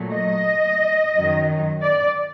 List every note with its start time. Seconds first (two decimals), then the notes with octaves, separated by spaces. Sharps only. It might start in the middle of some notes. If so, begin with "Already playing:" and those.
Already playing: A#2 F#3 A3
0.14 D#5
1.15 F#2 D#3 F#3
1.82 D5